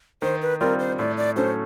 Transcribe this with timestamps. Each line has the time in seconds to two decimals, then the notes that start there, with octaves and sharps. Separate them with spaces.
0.22 D#3 C5
0.42 B4
0.61 G3 C4 F4 A#4
0.79 C5
0.99 A2 D5
1.17 D5
1.36 F#3 A3 C#4 C5